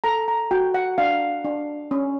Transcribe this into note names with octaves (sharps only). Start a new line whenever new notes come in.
A4 A#5
A#5
F#4 G5
F#5
D4 F5
D4
C#4